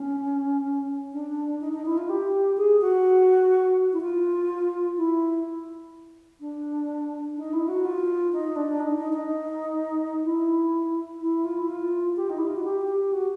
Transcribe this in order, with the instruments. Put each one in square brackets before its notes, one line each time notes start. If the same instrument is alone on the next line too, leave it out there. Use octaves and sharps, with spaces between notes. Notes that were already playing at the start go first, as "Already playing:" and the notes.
Already playing: [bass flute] C#4
D4
D#4
D#4
E4
F4
G4
G#4
F#4
E4
F4
E4
D4
D#4
E4
F#4
F4
D#4
D4
D#4
D#4
D#4
E4
E4
F4
E4
F4
G4
D#4
E4
F4
F#4
G4
G4
F#4